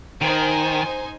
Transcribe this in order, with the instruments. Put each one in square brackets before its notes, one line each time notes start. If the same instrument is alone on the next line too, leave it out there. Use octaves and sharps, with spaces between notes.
[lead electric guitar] D#3 [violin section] D#4 C5 G#5